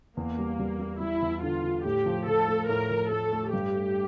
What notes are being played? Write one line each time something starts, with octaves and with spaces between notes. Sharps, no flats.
E2 A#3
G3
G3
G3
G3 E4
E2
D3 F4
D3
A2 G4
F3
F3 A4
A3
A2 A#4
F3
A3 A4
A3
G2 G4
A3